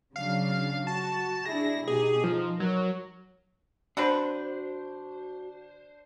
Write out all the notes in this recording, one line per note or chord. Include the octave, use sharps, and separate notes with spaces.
C#3 F#3 D4 F5
F#4 A5
D4 E4 G#4 A#6
B2 D#4 G4 G#4
F3 D#4
F#3 A#4
D3 C4 D4 F#4 B4 C5